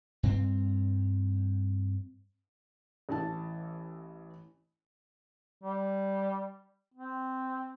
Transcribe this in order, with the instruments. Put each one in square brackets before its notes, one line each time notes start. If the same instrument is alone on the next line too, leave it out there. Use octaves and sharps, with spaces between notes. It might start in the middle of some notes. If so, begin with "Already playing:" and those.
[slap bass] G2 C4
[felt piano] A1 E3 A5
[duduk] G3
C4